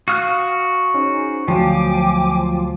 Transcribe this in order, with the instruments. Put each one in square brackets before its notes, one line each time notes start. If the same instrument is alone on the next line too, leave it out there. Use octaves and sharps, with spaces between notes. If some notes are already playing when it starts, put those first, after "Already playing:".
[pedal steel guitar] F#4 F6 F#6 [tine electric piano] F5 D#6
[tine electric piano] C#4 D#4 [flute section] G#4 C5
[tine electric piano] D2 F#3 F4 [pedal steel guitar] F3 [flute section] G5 G#5 D6